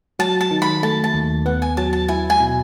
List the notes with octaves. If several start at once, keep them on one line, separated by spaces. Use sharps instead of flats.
F#3 A5
A5
D#3
B5
A3 A5
A5
D#2
B3 F#5
G#5
F#3 A5
A5
E4 G#5
G#5
B2